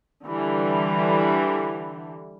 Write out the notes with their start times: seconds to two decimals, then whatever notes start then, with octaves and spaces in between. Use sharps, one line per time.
0.24 D3 E3 G3